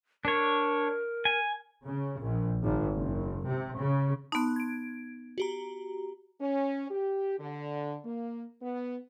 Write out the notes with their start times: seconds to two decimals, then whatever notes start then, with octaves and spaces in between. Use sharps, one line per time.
0.25 D4 A#4 C#5
1.25 G#5
1.84 C#3
2.20 A#1
2.63 G#1
2.95 F#1
3.47 C3
3.79 C#3
4.32 B3 D#4 A5 C6 F#6
4.56 G#6 D7
5.38 F#4 G4 A#5
6.40 C#4
6.90 G4
7.38 D3
8.04 A#3
8.61 B3